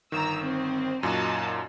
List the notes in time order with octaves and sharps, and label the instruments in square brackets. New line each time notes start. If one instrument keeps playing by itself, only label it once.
[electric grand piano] G1 D#3 [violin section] A#5 E6
[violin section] C4
[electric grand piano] F#2 A#2 [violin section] D#4 F#4 A5